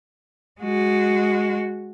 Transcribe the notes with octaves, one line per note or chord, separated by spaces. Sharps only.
G#3 F#4